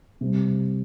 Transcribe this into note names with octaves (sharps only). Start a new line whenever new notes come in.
C3 G3 C4